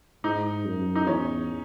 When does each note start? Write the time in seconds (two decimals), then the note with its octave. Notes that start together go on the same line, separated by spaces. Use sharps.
0.24 G#2 D#4
0.65 F#2
0.96 D#4
1.07 E2 C#4